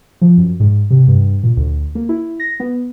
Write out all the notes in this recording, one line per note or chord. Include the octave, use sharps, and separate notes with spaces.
F3
F#2
G#2
C3
G2
A#2
D2
A#3
E4
A#6
B3